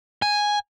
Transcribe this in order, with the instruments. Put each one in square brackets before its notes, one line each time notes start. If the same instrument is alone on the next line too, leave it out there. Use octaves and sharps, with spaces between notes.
[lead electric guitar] G#5